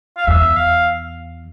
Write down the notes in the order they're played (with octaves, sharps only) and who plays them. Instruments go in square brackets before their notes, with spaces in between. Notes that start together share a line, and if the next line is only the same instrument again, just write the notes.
[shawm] F5
[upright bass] E2 [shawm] E5
[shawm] F5